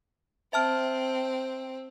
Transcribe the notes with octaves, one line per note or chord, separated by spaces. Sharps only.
C4 E5 A5 F6